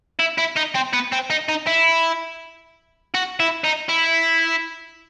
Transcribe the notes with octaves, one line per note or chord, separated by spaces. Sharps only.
E4
E4
D#4
C4
B3
C4
D#4
D#4
E4
F#4
E4
D#4
E4